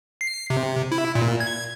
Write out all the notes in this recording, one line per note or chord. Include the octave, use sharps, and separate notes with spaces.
C7
C3
E4
A#2
G#6